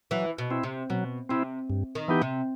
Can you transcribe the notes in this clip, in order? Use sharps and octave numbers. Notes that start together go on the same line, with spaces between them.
E3 F#3
B2
C4 E4
C3
B2 F#3
C3 C4 E4
G2
D#3
E3 B3 D#4 G4
C3